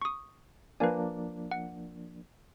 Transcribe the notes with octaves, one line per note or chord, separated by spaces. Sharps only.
C#6 D#6
F3 A#3 D4 B4 G#5
F#5